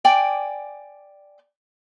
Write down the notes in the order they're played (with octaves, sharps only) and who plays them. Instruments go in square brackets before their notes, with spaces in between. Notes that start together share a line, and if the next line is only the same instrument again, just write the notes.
[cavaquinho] D5 G5 G#5 D6